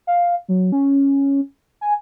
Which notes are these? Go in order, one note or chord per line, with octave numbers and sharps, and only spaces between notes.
F5
F#3
C#4
G#5